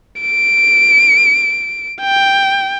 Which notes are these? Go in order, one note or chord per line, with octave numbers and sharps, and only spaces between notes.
D7
G5